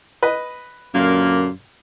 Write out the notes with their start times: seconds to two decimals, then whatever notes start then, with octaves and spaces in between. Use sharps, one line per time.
0.23 B4 D#5
0.94 F#2 A#2 D3 A#3